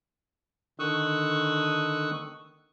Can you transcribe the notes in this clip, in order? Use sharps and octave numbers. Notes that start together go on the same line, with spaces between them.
D3 D#3 C#6 D#6 E6 F#6